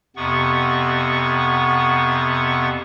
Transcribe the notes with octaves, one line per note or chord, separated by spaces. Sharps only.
F2 C3 B3 F#5 C#6